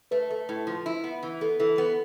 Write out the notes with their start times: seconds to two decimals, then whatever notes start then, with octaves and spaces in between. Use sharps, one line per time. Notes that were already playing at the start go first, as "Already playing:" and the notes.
0.11 A3 B4
0.30 A3
0.49 A2
0.67 F3
0.86 E4
1.04 B3
1.23 E3
1.41 B3 A4
1.60 E3 A4
1.77 B3 A4